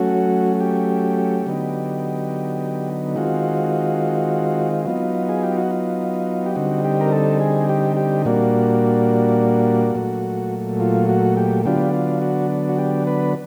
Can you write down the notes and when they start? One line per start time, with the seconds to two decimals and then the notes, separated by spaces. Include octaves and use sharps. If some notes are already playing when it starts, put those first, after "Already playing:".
Already playing: F#3 A3 C#4 F#4
0.60 G4
1.46 D3 F#3 B3 D#4
3.16 D#3 G#3 C4 F4 F#4
4.86 F#3 B3 D#4 F4
5.29 G#4
5.43 G4
5.57 F#4
5.71 F4
6.46 G4
6.55 D3 G3 C4 D#4 F#4
6.85 G4
7.01 A#4
7.12 A4
7.40 G#4
7.69 G4
7.97 G4
8.25 A#2 G3 A#3 D4 F#4
9.95 A#2 F#3 A3
10.80 F4
11.09 F#4
11.37 G4
11.65 D3 F#3 B3 D4 F4 G4
11.94 F4
12.22 F#4
12.69 F#4
12.78 G4
13.07 B4